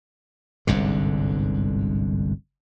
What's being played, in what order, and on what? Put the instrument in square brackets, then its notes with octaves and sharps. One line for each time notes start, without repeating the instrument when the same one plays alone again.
[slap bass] G1 C2 G#2 D3